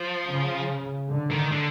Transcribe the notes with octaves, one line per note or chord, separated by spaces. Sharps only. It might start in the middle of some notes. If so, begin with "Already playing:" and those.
Already playing: F3
C#3
D3
D#3
D3